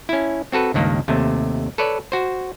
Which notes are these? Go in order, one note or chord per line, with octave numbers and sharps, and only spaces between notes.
C#4 E4
C4 F#4 A4 B4
C#2 G2 D#3 A#3
D#2 C3 A3
A4 B4 C#5 D5
F#4 C5